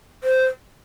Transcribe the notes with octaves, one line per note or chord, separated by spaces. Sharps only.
C5